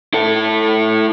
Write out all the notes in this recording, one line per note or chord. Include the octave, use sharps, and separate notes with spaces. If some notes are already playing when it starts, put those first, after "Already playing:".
E4 A4